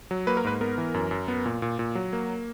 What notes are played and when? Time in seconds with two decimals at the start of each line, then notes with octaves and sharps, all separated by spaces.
0.11 F#3
0.27 A#3 B4
0.37 A#4
0.44 G#2 B4
0.61 B3 A#4
0.78 E3
0.94 F#2
1.11 F#2
1.28 B3
1.46 A#2
1.62 A#2
1.79 A#2
1.95 F#3
2.13 A#3